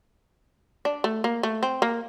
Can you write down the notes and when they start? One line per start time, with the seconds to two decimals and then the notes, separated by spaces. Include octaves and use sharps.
0.85 D4
1.04 A3
1.24 A#3
1.43 A3
1.63 C4
1.82 A#3